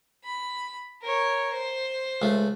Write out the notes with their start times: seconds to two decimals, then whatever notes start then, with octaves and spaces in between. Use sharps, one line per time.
0.24 B5
1.02 A#4 C#5
1.53 C5
2.22 C#2 A3